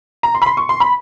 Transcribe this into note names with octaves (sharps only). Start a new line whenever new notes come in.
A#5
C6
B5
C6
C#6
C6
B5